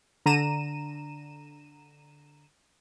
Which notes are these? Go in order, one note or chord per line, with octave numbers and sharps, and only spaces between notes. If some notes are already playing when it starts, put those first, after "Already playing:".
D3 A#5 D#7 E7